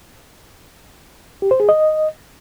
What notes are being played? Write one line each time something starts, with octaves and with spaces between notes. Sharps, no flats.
G4
C5
G#4
D#5